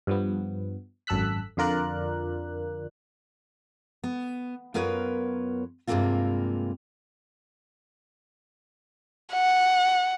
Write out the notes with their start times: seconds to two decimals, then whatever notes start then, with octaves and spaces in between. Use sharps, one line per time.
0.07 G2 F3 B3
1.07 G#1 F#2 A4 E6 F#6 B6
1.57 F2 D3 F4 A#4 D5 F#6
4.04 B3
4.74 F#2 B3 F4 A#4 B4 C#5
5.87 G2 C3 G#3 A#3 C4 F4
9.33 F#5